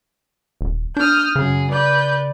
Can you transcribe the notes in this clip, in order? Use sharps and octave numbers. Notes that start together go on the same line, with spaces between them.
D#1
D4 D#6 F6 G6
F#2 C#3 G#4
B4 D5 G6